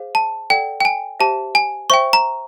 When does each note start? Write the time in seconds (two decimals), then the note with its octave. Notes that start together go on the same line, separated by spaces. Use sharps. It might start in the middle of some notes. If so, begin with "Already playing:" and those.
Already playing: G#4 C5 F5
0.15 A5
0.50 A4 D5 F#5 G5
0.81 G5
0.85 G#5
1.20 G4 C5 E5 A5
1.55 G#5
1.90 C5 E5 G5 C#6
2.13 A#5